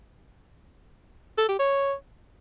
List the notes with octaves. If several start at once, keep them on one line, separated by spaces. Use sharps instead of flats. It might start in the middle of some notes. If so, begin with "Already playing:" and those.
A4
G4
C#5